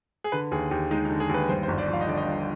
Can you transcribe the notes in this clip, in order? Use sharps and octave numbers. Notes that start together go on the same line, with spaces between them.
G#4
D3 B4
D#2 G#4
D#2 G4
G#3 D#4
D#4
D3
G#4
D#2
B4
G2 C5
C5
G1
D5
F3 F5
D#5
D3 D5
D#5
G2